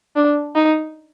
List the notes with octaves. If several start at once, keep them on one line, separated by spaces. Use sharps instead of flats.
D4
D#4